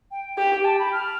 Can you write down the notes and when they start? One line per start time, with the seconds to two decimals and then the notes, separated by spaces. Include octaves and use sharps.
0.11 G5
0.38 G4
0.51 G5
0.65 A5
0.79 B5
0.92 F6